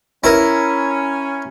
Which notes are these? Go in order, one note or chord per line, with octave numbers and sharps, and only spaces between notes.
C#4 E4 A#4